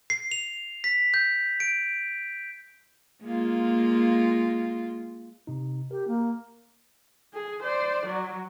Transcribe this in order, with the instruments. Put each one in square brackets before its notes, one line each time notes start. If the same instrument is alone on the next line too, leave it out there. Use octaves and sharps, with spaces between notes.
[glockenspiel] C7
F7
B6
G6
D7
[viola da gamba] G#3 A#3 F4
[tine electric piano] C3 D#4
[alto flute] G4 [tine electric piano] A#4
[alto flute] A#3
[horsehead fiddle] G#4
C5 D5
F#3